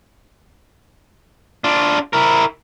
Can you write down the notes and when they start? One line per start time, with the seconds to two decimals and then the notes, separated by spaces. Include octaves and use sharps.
1.64 D4 F4
2.13 E4 A#4